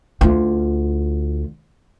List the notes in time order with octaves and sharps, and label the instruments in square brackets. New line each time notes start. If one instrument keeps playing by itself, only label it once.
[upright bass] D2 F4